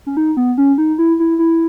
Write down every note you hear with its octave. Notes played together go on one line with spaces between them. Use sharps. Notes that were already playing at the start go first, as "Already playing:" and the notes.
C#4
D#4
B3
C#4
D#4
E4
E4
E4